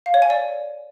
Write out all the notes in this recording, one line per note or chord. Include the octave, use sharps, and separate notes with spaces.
F5
C#5
G#5
D5